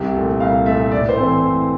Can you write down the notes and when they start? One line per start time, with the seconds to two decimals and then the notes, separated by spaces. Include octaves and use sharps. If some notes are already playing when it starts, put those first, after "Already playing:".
Already playing: C2 G4
0.15 A#2 A3
0.40 C2 F5
0.66 A#2 A3 E5
0.91 A2 D5
1.09 C5
1.17 E3 A3 C4
1.43 A2